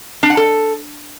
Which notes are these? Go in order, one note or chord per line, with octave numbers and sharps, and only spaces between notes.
D4
F#5
A4